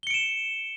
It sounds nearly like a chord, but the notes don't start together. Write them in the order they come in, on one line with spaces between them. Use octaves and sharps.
G7 C#7 D7 E7